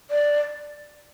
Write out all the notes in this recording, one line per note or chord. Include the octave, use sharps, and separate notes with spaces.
D5